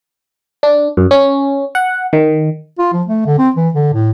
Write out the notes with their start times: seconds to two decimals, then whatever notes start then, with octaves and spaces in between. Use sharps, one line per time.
0.63 D4
0.97 F#2
1.11 C#4
1.75 F#5
2.13 D#3
2.79 F4
2.93 F3
3.07 A3
3.26 D3
3.38 C4
3.56 E3
3.74 D3
3.94 A2